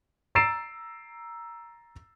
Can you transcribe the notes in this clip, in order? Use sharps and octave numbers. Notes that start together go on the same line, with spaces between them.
A#5 E6 A6 C7 D7 E7